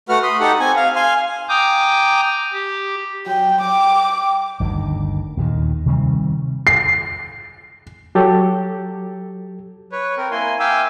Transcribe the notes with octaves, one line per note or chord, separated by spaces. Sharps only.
A3 F#4 B4 F#5 F6
B5 C6 D#6
D#4 G4 A4 F#5
C4 G#5
F5
F5 G#5 C6
G5 G#5 A#5 D6 D#6 G6
G4
F#3 G5
G5 D6
G1 D2 D#3
D#2 A#2 D#3
C3 D#3 G3 C4
C7
F#3 G4 A4
B4 C#5
C4 A#4
A#3 E4 G#5 C6
E5 F5 G5 G#5 D6 E6